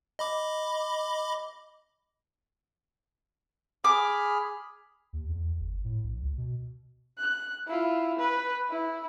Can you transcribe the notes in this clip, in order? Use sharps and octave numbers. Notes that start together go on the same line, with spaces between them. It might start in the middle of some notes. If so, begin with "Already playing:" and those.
D#5 B5 D6
G#4 B5 D6 F6
D#2
E2
G1
A2
A#1
C#2
B2
F#6
E4 F4
B4
E4